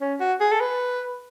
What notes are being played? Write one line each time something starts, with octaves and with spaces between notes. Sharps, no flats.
C#4
F#4
G#4
A4
B4